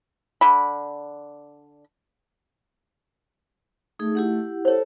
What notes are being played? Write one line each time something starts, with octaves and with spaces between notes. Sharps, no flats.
D3 B5
A3 D#4 G#4
E4 G4 F#5
A4 C5 C#5